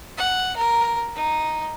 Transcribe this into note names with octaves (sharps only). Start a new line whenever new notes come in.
F#5
A#4
D#4